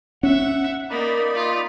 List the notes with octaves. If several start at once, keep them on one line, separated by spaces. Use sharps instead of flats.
C#4 E5 F#5
A#3 D#4 D5 B5
F4